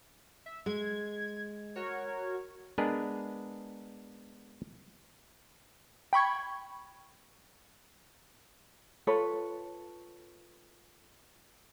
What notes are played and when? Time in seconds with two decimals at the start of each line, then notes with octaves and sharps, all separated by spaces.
0.46 E5
0.66 G#3 G#6
1.76 F#4 A#4 C#5
2.78 G#3 B3 D4 G#4 A#4 B4
6.13 G5 B5 C#6 G#6
9.07 F4 A4 B4 C#5